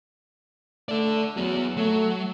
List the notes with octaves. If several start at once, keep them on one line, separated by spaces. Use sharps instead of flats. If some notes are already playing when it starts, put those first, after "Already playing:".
A3 A4 D5
F#3 B3 G#4
F#3 A3